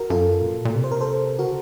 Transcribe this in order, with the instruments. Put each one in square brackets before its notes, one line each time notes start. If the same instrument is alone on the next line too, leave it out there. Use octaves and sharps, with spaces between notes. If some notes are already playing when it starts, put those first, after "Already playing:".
Already playing: [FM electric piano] F#4 A#4
[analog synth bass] F#2 [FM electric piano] F4 A4
[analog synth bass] A#2
A#2
C3
[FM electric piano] C5
A#4
A4 C5
[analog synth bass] C#3 [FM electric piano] F#4 A#4